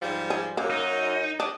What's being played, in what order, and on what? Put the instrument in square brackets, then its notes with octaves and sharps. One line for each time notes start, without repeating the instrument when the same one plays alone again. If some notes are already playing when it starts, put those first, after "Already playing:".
[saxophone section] G#2 F3 G3
[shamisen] G#4
[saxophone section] F#2 [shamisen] A#3
[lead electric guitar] D#4
[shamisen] D4 [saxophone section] D5 D#5